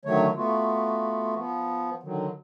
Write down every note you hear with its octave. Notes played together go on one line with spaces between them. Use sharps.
D3 D#3 F#3 A3 C#5
A3 B3 F4 F#4
F3 B3
D3 D#3 F#3